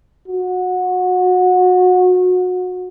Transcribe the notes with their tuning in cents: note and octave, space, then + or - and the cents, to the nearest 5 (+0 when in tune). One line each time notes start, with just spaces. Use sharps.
F#4 -25